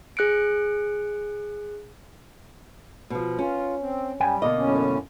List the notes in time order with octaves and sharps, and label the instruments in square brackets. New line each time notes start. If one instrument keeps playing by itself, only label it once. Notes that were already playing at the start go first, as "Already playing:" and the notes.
[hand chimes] G#4 F#6 C#7 D7
[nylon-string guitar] B2 F3
[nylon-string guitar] C#4 [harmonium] F4
[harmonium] C4
[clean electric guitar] F#2 G5 G#5 [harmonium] G3
[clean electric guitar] B2 D3 A#3 [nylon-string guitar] D#5
[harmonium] F#2 A2 C#4